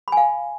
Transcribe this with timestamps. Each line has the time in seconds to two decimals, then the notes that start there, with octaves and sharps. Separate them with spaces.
0.08 B5
0.12 G#5
0.17 F5